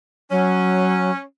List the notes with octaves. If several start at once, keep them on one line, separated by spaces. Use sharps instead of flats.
F#3 C#4